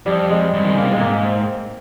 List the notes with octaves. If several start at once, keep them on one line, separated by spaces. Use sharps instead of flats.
F2 G3
G#3
G2
D#3
C#3
C3 A#3
A#2 G#3
G#2 A#3
C4